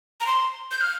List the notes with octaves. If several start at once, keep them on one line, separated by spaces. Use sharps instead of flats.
A#5
C6
G6
F6